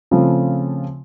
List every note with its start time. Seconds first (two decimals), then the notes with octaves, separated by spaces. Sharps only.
0.11 C#3 F3 A3 C4 F4